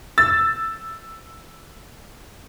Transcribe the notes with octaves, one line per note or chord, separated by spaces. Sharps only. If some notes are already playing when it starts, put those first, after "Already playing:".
E6 A6